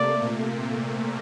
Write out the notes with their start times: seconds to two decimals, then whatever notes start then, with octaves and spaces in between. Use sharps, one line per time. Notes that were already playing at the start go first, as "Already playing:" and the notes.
Already playing: C3 A3 A#3 D5
0.22 A#2